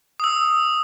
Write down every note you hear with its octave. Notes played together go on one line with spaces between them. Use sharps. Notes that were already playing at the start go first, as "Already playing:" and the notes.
D#6 E6